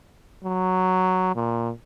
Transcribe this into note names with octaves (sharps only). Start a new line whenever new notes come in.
F#3
A#2